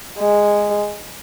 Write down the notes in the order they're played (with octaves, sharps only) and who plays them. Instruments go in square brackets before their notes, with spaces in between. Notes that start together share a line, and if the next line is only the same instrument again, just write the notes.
[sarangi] G#3